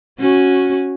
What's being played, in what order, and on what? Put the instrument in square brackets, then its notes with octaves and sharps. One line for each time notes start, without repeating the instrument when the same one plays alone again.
[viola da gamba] C#4 F#4